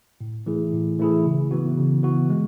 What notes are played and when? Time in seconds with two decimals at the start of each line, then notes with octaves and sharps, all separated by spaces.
0.21 A2
0.46 E3 A3 E4 G#4
0.73 A2
0.99 E3 A3 E4 G#4
1.25 C#3
1.51 E3 B3 F#4
1.77 C#3
2.03 E3 B3 F#4
2.30 G#3